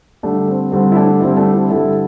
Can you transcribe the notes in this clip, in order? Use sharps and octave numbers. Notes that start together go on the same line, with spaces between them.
G2 D3 G3 A3 D4
C4
G2 D3 G3 C4
E4
A3 D4
G2 D3 G3 C4 E4
A3 D4
C4 E4
G2 D3 G3 E4 A4